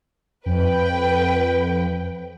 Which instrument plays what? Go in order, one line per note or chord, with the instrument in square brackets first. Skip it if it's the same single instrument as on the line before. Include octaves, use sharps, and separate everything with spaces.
[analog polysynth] F2 [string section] B4 G5